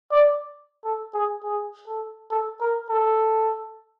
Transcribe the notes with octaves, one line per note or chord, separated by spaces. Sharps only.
D5
A4
G#4
G#4
A4
A4
A#4
A4